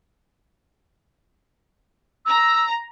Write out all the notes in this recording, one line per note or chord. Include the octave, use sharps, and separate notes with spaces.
A#5 E6